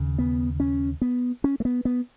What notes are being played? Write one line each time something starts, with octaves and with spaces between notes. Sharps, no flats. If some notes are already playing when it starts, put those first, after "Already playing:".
Already playing: D#2 C#3
B3
C#4
B3
C#4
A3
B3
B3